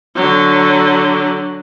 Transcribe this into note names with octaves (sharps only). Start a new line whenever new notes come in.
D3 F#3